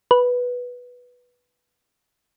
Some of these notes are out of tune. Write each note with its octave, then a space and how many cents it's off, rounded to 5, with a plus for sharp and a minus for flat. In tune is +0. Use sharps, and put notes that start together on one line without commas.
B4 -5